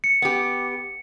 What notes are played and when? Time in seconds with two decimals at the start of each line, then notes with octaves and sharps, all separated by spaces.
0.04 C#7
0.22 B3 G4